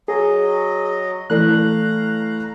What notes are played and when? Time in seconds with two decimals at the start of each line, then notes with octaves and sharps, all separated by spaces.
0.08 F#3 G#4 D#5
1.30 E3 A3 D5 F5 A#5 F#6